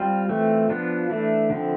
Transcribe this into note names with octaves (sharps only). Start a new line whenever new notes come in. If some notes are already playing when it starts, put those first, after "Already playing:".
Already playing: G3 C4 F4
E3 A3 C4
F3 B3 D4 F4
E3 A3 D4 E4
D3 F3 C4